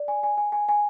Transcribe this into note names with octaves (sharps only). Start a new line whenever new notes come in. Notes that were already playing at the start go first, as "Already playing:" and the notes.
Already playing: D5
G#5
G#5
G#5
G#5
G#5